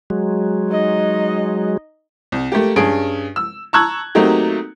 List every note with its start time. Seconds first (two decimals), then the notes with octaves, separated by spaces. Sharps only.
0.10 F#3 G#3
0.71 D#4 D#5
2.32 C2
2.52 A3 A#3 G4
2.76 G2 C#4 G#4 D#6 D7
3.36 E6
3.73 A5 A#5 C#6 E6 F#6 G#6
4.15 F#3 A3 A#3 C4 D#4 G4